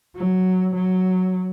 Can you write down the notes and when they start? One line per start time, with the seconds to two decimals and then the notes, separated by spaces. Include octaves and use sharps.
0.16 F#3
0.75 F#3